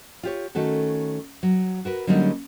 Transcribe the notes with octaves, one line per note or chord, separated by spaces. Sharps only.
F4 G4 C#5
D#3 A3 C#4 F#4 A4
F#3
F#4 A#4 B4
D3 F#3 G3 A#3 C#4 D#4